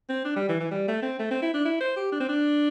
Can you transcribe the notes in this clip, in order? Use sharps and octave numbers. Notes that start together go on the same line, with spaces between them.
C4
D4
G3
E3
E3
G3
A3
C4
A3
C4
E4
D4
E4
C5
G4
D4
C4
D4